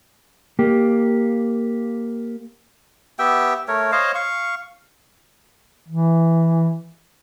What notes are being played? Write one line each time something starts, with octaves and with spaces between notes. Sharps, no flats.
A#3 G4
B3 G4 E5 G5
A3 A#4 C#5
C5 C#5 D#5 F5
F5 C#6
E3